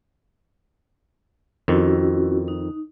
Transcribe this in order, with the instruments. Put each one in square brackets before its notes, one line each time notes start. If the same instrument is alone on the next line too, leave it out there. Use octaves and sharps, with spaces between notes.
[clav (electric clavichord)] F2 D#3 [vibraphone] C#4 E4 F#4
[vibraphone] D#4